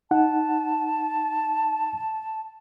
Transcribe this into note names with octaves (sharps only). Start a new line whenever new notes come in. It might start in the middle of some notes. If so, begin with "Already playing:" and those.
D#4 F#5 A5